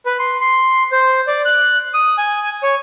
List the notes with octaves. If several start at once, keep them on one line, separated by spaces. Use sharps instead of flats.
B4
C6
C6
C5
D5
F#6
D#6
G#5
C#5